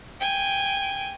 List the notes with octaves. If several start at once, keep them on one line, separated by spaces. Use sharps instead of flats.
G5 G#5